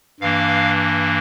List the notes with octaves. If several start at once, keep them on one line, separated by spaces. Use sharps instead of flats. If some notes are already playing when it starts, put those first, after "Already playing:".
G2 E3 A#3 D4 F5